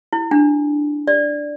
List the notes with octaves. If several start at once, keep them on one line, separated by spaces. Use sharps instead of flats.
E4
D4
D5